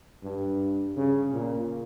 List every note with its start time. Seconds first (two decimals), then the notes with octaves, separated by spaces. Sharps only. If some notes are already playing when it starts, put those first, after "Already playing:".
0.23 G2
0.96 C#3
1.33 A#2